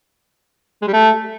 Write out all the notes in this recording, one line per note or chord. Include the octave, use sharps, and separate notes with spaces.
G#3
G3
A3